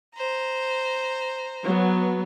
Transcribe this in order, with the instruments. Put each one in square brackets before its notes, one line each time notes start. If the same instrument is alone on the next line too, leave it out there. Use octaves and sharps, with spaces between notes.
[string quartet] C5 A#5
[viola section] F#3 B3